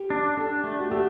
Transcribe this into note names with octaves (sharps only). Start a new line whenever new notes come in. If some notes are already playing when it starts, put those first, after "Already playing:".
Already playing: G4
D4
D4 A4
A3
F#4
A3 G4